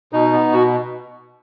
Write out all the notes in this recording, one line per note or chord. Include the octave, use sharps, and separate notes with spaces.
B2 D#4
B3
B2 F#4